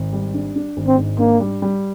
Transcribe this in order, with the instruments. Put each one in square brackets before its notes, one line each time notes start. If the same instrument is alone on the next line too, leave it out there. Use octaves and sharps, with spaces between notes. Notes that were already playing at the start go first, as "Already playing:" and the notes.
Already playing: [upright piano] G#1
G3
D4
D4
G#1
[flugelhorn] C4
[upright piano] G#2
[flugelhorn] A#3 [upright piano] D4
[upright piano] G3
G3